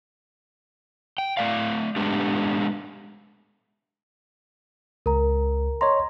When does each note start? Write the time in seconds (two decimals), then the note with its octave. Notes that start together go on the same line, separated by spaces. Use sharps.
1.18 G5
1.37 A3 D5 F5
1.96 G#3 A3 B3 D4 G4
5.06 C#2 A#4 A#5
5.81 C#5 D#5 A#5 C6